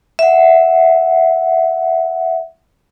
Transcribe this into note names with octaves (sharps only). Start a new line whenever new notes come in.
E5 F#5